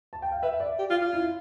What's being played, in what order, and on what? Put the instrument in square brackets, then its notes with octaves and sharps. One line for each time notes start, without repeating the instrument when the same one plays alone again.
[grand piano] A5
G5
F5
[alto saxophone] B4 [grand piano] E5
[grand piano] D5
[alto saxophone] G4
F4
F4
[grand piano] E4